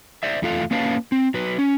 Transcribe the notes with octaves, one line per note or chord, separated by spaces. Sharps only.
C5 D5 E5
E2 A3 F4 A4 F5
A#3 C#4 B4 C#5 F5 A5
C4
F#3 B4
C#4